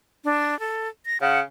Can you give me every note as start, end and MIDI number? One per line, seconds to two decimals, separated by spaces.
0.25 0.58 62
0.59 0.88 69
1.06 1.21 94
1.21 1.41 49
1.21 1.40 78